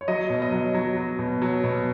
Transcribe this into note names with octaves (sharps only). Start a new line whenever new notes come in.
C#5
F#3 D#5
B2
D#5
F#3
F#3
F#3
B2
F#3
B2